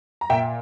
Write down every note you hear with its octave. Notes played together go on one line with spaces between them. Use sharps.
A#5
A#2 E5 G5